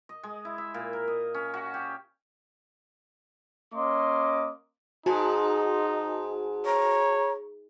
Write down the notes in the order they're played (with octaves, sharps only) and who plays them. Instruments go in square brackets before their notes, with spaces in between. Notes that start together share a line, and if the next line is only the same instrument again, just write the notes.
[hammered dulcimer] D#5
G#3
E4
E5
A#2
A#4
D#5
C#4
F#4
G4
[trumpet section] A#3 C#4 D#5 C6 D6
[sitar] G#2 [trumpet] D#4 [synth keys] F#4 G#5 A5
[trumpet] C#5 [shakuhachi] A#5